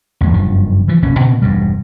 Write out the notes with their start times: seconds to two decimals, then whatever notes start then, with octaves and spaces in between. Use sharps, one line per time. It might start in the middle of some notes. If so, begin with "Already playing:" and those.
0.21 A#1 E2 G#3
0.33 F#1 G2 C#3 F3
0.88 E3 F3
1.02 F1 A#1 B2 C#4
1.19 A#2 C#3 B3 C4
1.42 E1 G2 G3